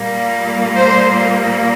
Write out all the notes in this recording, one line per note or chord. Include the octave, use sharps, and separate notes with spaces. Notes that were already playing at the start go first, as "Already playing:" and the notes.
Already playing: A#2 G3 A#3
C5